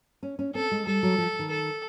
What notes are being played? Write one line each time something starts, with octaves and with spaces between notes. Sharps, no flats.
C#4
C#4
C4 A4
G#3
G3 A4
F#3
F3
D#3
A4